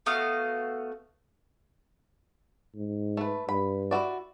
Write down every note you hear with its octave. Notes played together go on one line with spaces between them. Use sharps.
A3 B3 F#4 F5
G#2
A3 B4
G2 B5
E4 F#4 D5